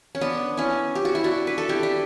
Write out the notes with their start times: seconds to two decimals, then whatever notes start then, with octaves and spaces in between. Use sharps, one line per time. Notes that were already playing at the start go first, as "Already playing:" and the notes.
0.15 C#4
0.21 B3 D4
0.57 C#4 E4
0.95 G4
1.05 F#4
1.15 E4
1.24 D4 F#4
1.47 B4
1.58 A4
1.69 E4 G4
1.83 D4